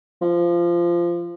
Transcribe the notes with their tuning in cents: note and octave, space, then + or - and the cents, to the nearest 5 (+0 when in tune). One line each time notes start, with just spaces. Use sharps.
F3 -15